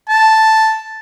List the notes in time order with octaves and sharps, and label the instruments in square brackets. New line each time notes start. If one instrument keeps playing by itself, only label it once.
[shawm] A5